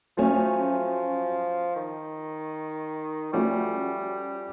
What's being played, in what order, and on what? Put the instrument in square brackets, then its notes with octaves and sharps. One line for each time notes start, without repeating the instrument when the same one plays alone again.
[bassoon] F3 [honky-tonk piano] F#3 A3 C#4
[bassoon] D#3
[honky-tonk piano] F3 A3 C#4 F#4 A4 [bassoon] G3